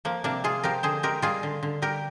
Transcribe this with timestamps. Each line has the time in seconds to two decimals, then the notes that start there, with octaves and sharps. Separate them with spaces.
0.05 F3 A#3
0.24 C3 A#3 D4
0.44 G#3 F4 G#4
0.64 F3 G4 A#4
0.83 D3 G#4 C5
1.03 G#3 G4 A#4
1.22 G3 F4 G#4
1.43 D3
1.63 D3
1.82 G3 G4 A#4